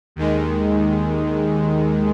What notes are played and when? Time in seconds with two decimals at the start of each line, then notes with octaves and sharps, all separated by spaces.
0.16 D#2 D#3 G#3